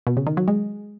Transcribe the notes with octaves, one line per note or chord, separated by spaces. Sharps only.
B2
C#3
D#3
F#3
G#3